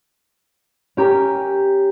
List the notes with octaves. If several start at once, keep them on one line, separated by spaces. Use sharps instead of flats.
C#4 G4 A#4